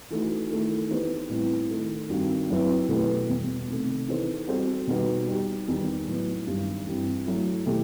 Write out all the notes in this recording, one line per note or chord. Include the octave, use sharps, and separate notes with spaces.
E3 A3 D#4 F#4
D#3 A3 E4
E3 B3 D#4 G4 C5
A2 G3 C4 E4 B4
D#3 A3 D#4 A4
G2 D#3 G3 C4 F#4
F#2 F#3 C4 E4 B4
B2 A3 E4 G4 B4
E2 B2 G3
C3 D#3 A3
E3 B3 D#4 A4 C5
G3 C4 F#4 A4 C5
B2 G3 D#4 F#4 B4
G3 D#4 G4
E2 D#3 G3 D#4
A2 F#3 B3
G2 D#3 G3
G2 E3 G3 C4
F#3 A3 E4
B2 A3 E4 G4